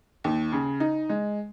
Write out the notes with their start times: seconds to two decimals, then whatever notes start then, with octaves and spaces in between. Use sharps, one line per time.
0.24 D#2
0.52 C#3
0.80 D#4
1.09 G#3